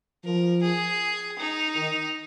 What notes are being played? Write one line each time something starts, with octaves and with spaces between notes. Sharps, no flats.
F3 A#4
G#4
D#4
D#3